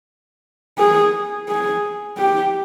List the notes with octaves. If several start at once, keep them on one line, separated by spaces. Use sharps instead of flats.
G#4
G#4
G4